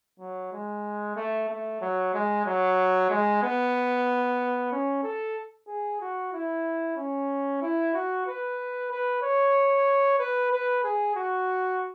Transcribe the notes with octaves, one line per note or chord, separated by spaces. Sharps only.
F#3
G#3
A3
A3
F#3
G#3
F#3
G#3
B3
C#4
A4
G#4
F#4
E4
C#4
E4
F#4
B4
B4
C#5
B4
B4
G#4
F#4